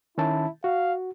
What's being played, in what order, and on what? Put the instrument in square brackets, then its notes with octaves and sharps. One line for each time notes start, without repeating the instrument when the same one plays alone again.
[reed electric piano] D#3 C#4 A5 [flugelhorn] E4
[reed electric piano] F#4 [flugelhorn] F5